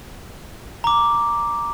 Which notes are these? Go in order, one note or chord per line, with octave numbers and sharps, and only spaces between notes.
A#5 D6